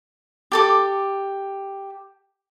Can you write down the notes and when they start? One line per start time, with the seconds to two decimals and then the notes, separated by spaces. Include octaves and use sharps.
0.52 G4 A4 D6